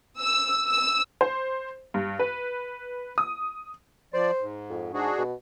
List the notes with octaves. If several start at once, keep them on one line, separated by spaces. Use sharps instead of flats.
E6
E6
C5
G2
B4
D#6
F3 C5 D5
G#2
F2
G#2 D4 F#4 G#4
B2